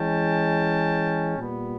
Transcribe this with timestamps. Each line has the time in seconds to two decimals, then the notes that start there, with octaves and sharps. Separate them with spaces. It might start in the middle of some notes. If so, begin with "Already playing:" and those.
Already playing: E3 G#3 C#4 G5 A5
1.37 A#2 G3 B3